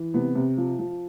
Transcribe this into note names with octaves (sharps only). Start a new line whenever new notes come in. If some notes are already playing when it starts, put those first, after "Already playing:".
Already playing: E3
C3 B3
C3
F3
F3